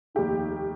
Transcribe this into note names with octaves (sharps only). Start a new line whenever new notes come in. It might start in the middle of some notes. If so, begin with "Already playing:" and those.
F1 D#2 D#3 G4